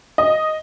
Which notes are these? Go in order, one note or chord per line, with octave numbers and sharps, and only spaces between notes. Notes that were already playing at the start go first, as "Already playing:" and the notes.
D#5